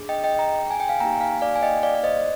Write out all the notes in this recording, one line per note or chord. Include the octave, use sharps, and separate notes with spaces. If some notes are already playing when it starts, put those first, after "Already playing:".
Already playing: D4 G#4
D#5 G5
D#5 G5
G5 A#5
G#5
G5
F5 G#5
A#3 D#4 G4 G5 A#5
F5 G#5
D5 F5
G#5
D#5 G5
D5 F5
D5
C5 D#5